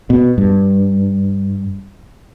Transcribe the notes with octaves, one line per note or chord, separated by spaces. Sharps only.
B2
G2